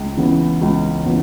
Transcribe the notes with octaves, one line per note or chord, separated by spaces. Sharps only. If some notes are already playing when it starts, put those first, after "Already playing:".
Already playing: C#2
C#3 E3 B3
C#2
C#3 E3 B3